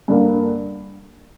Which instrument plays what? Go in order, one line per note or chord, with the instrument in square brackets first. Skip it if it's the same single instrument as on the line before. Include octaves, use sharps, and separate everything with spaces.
[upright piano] G2 D3 A#3